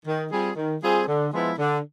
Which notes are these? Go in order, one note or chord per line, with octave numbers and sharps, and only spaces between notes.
D#3
G3 C4 F4 G#4
D#3
G3 C4 F4 G#4
D3
F3 G#3 B3 E4
D3